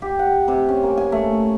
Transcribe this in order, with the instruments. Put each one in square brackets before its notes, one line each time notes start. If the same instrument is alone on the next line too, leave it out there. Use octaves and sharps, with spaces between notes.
[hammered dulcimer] G4
F#5
C3
C#4
A#3
G#5
A3